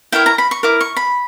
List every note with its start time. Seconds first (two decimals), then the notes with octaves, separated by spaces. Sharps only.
0.12 E4 A#4 C#5 G5
0.26 A#5
0.38 B5
0.51 C#6
0.63 E4 A#4 D6
0.81 C#6
0.97 B5